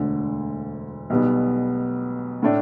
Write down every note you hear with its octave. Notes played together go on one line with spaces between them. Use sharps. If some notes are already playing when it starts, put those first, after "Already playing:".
Already playing: E1 D2 D3
B1 B2 G3 B3
A2 A3 D4